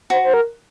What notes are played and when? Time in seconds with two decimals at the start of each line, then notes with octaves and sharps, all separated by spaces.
0.10 F#4 C5
0.24 C5
0.34 A#4